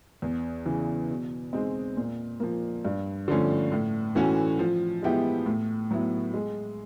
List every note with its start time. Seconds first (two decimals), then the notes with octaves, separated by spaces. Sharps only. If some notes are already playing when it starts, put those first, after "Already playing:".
0.22 E2
0.66 C#3 E3
1.10 B2
1.53 G#3 C4 D#4
1.97 A#2
2.40 F3 A#3
2.85 G2
3.28 D3 F3 A3 C#4
3.72 A2
4.15 E3 A3 C#4 F#4
4.59 F3
5.02 G#3 B3 E4 G4
5.46 A2
5.91 F#3 B3 E4
6.34 G#3